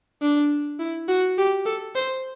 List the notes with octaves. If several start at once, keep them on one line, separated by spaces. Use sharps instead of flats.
D4
E4
F#4
G4
A4
C5